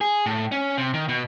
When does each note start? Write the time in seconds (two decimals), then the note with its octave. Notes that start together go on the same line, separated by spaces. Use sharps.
0.01 G#4
0.26 A2
0.52 C#4
0.78 C3
0.94 D#3
1.08 B2